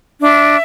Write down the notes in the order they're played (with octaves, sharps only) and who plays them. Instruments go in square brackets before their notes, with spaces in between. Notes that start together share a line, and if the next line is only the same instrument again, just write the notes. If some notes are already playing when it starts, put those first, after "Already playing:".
[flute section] D4 E5